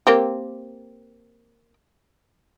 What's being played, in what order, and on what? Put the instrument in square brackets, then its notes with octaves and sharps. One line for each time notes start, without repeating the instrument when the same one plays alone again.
[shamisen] A#3 C4 G4